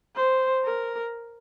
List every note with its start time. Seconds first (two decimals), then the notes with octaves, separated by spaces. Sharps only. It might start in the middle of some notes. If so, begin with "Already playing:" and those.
0.16 C5
0.64 A#4